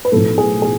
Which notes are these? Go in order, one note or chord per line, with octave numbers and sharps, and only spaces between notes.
B4
B1 A2 F3 A4
G#4
G#4